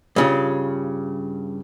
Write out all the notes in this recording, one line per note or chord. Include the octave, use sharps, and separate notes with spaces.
G2 C#3 F4